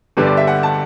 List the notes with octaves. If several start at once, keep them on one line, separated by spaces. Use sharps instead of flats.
G1 G2 D3 G3 D4 B4
D5
E5
F#5
A5